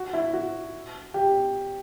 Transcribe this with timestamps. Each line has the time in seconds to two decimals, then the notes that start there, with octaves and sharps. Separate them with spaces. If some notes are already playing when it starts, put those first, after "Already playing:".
Already playing: F#4
0.13 E4
0.33 F#4
1.14 G4